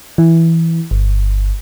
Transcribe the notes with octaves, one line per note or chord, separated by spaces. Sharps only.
E3
G1